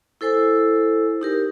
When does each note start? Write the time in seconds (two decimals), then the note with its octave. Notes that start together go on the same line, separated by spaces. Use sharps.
0.21 E4 A4 C5 G#5 E6
1.21 D#4 G4 A#4